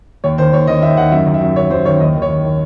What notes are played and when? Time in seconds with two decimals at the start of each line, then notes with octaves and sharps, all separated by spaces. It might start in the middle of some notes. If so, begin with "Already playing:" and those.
0.24 D#2 C#5
0.38 D#3 C5
0.53 D#2 C#5
0.67 D#3 D#5
0.82 D#2 E5
0.97 D#3 F#5
1.12 F#2 E5
1.27 D#3
1.34 E5
1.41 F#2
1.56 D#3 C#5
1.70 F#2 C5
1.85 D#3 C#5
2.00 D#2 D#5
2.15 D#3
2.22 C#5
2.29 D#2
2.44 D#3